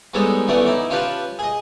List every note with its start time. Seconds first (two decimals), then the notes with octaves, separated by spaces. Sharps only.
0.14 G3 G#3 B3 D#4 A4 C#5
0.48 E3 A3 B3 C#4 D5
0.66 D#4 E4 D5
0.90 C#4 F4 G4 B4 A5
1.39 G#4 D#5